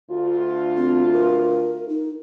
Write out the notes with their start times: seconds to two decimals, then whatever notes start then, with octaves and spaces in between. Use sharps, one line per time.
0.11 D2 F4
0.77 C4
1.13 A#4
1.89 D#4